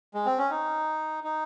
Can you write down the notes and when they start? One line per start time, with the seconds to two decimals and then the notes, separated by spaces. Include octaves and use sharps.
0.14 G#3
0.26 C4
0.38 C#4
0.50 D#4
1.24 D#4